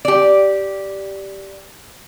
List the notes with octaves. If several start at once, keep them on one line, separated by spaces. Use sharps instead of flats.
G4 D5